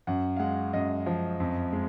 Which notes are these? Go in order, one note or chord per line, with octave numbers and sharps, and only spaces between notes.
F#2 F#5
F5
G#3 F#5
F#2 D#5
F3
F2
G#3